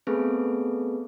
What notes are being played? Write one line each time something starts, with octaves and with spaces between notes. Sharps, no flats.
A3 B3 C4 G#4 A4 B4